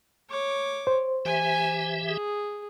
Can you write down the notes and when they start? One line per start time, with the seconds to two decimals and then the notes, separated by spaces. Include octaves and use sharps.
0.30 C#5 D6
0.87 C5
1.25 E3 G4 E5 G#5
2.06 G#4